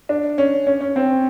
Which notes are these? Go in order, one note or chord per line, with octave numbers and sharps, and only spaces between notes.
D4
C#4
C#4
C#4
C4